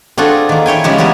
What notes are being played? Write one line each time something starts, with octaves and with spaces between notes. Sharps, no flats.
C4 D4 F4 F#4 G#4 A4
D#3 A#3
E4 C#5 G5 G#5
C#3 F3 G#3 G4
F3 G3 B3 E4 A#5